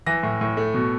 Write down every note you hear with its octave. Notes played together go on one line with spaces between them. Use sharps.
E3 A#6
A2
A2
A3
B2